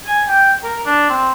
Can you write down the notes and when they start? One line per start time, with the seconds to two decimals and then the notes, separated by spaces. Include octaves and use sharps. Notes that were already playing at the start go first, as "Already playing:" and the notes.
0.06 G#5
0.28 G5
0.63 A#4
0.86 D4
1.09 C4